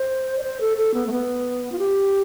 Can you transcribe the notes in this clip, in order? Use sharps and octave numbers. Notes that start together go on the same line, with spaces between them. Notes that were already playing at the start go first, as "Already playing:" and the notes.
Already playing: C5
D5
C5
A4
A4
B3
A3
B3
F4
G4